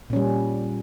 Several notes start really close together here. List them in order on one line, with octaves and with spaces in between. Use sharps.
A#2 C#4 G3